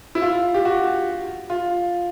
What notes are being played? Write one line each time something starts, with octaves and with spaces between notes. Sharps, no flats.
E4
F4
G4
F#4
F4